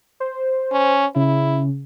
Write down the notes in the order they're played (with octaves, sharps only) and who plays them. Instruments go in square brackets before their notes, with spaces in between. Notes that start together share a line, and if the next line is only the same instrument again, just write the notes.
[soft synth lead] C5
[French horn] C#4
[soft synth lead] C#3 [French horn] E4